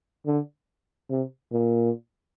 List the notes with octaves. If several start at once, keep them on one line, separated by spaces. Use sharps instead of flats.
D3
C3
A#2